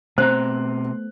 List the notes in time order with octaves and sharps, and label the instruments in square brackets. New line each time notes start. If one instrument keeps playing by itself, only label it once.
[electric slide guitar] B2 C4 A#5 [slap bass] A3 B3 [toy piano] C5 [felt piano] F#6